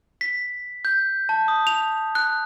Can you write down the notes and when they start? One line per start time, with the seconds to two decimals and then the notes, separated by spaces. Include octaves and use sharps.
0.21 B6
0.85 G6
1.29 A5
1.48 D#6
1.67 F7
2.15 F#6